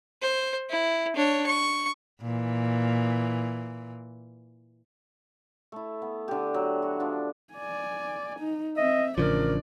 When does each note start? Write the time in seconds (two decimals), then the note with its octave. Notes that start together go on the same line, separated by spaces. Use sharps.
0.22 C5
0.69 E4
1.16 D4 C#5
1.47 C#6
2.21 A#2 E3
5.72 A3 E4
6.02 B3
6.28 D3 G4
6.54 F#3
6.82 F#4
7.00 F3 D4
7.54 D5 G#5
8.39 D#4
8.77 C4 D#5 E5
9.18 A1 C#3 F3 D4 A#4 D5